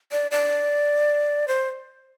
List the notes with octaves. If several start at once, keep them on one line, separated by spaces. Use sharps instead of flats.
D5
D5
C5